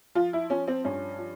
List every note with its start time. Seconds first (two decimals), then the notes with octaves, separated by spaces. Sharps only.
0.15 F3 F4
0.33 E4
0.50 F3 C#4
0.68 C4
0.84 G2 C#4
1.18 F3